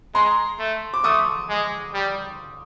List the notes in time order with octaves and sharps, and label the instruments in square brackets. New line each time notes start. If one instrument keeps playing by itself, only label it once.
[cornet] G#3 [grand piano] A#5 C6
[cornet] A3
[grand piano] D6
[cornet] A3 [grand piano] C#6 D#6
[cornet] G#3
G3